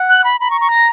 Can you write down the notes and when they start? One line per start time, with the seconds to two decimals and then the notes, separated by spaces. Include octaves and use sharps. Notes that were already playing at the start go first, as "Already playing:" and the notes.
Already playing: F#5
0.09 F#6
0.24 B5
0.40 A#5 B5
0.51 C#6
0.61 C#6
0.70 A#6